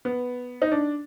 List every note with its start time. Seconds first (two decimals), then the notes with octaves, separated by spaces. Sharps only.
0.05 B3
0.62 D#4
0.72 D4